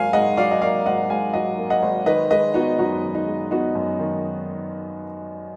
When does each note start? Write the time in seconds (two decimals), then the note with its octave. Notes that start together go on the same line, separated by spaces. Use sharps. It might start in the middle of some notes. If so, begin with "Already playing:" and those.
Already playing: G#1 G#2 F#3 A#3 F5 G#5
0.13 G#2 D#5 F#5
0.37 F#3 D5 F5
0.51 D#5
0.61 A#3 D5 F5
0.86 G#1 D#5 F#5
1.10 G#2 F5 G#5
1.34 F#3 D#5 F#5
1.58 A#3
1.70 D#5 F#5
1.82 G#1
2.06 D#3 B4 D#5
2.31 G#3 B4 D#5
2.54 B3 D#4 F#4
2.79 F#2 D#4 F#4
3.03 D#3
3.15 D#4
3.27 G#3
3.51 B3 D#4 F#4
3.75 F#2
3.99 D#3